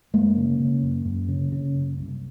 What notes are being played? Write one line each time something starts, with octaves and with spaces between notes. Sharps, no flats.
F#2 G#3 A#3
C#3
C#3
F#2
F#2
C#3
C#3
F#2
C2